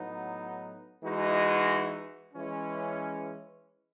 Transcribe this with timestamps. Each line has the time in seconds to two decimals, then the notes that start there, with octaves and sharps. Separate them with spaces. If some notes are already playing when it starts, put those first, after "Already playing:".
Already playing: A2 F#3 B3 D#4
1.04 E3 G#3 D#4 F#4
2.33 E3 G#3 C#4